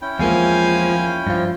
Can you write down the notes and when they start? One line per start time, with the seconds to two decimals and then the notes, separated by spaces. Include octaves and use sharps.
0.02 C#4 E4 G5
0.19 E2 F3 G#3 A#3 F5 G#5
1.27 G2 F3 F4